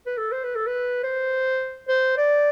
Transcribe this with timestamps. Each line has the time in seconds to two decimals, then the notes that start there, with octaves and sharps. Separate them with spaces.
0.06 B4
0.17 A4
0.32 C5
0.44 B4
0.55 A4
0.67 B4
1.03 C5
1.88 C5
2.17 D5